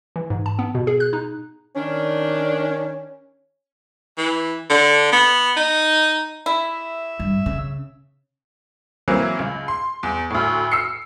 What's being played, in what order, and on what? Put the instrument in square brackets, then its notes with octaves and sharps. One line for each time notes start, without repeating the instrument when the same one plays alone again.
[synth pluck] E3
G#2
A5
B3
B2
G#4
F#6
D#4
[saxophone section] D#3 D4 [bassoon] C#4
[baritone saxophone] E3
D3
B3
D#4
[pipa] E4 [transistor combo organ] E5
[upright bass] G2
C#3
[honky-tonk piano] E3 F#3 A#3 C4 E4
C#2
C6
E2
D2 A2
E6 C7 C#7